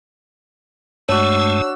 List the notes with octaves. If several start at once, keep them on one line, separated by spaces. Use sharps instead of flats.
G2 G#3 A3 D4 F#4 C#5 E6